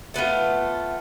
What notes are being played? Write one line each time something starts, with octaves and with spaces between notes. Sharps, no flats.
A3 B3 E4 F4